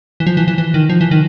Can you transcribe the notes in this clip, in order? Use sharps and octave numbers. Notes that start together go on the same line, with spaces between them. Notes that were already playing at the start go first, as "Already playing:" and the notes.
E3
F3
E3
E3
E3
D#3
F3
E3
D#3